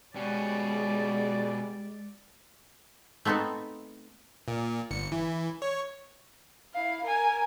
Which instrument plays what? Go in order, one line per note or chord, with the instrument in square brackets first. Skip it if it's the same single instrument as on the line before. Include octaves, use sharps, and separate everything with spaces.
[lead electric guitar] B2 C#4 [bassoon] G3 [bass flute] G#3 [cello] D5
[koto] A3 B3 C4 D#4 A4
[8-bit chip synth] A#2
G1 C#7
E3
C#5
[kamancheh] E4 F5
A#4 G#5